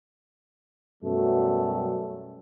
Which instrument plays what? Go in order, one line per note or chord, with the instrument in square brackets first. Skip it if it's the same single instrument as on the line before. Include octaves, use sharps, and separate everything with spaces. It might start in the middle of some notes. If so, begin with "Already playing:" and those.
[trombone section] F#2 B2 F#3 G3 A3